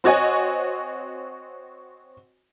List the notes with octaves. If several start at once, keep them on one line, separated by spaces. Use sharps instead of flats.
C4 F#4 C#5 D#5 G#5